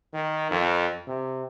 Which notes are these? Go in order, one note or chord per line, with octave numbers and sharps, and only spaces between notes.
D#3
F2
C3